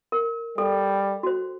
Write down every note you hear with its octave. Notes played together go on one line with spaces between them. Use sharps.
A#4
G3 A4
F#4 C5